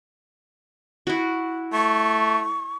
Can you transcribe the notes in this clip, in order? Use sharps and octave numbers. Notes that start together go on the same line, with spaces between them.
E4 F#4
A3 C#6